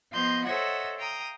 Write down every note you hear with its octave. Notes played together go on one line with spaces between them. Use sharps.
F3 B3 D#5 F5 C6 G6
A4 C5 C#5 D#5 E5 F#5
F5 G5 A#5 D#6